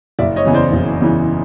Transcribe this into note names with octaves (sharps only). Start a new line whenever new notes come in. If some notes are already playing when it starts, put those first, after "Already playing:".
F#1 D5 E5
C#5 D#5
E2 C#3 E3
C5 D5
F#1
E2 C#3 E3